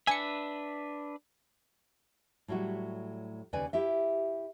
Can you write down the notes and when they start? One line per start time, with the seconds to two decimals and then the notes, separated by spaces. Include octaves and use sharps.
0.07 D4 B4 E5 G#5 C#7
2.48 A2 F#3 G3 E4 F#4
3.53 D#2 C#3 B4 D5 G#5
3.73 E4 G4 E5